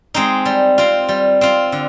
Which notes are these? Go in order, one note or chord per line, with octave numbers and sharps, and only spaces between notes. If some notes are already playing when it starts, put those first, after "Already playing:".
G#3 C4 D#4
G3
C4 F4
G3
C4 F4
D3